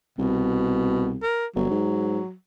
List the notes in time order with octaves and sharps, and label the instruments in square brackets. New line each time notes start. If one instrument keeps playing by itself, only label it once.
[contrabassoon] C2 [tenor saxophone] B2
[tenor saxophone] A#4
[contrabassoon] G1 [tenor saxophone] F#3
[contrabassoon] G#2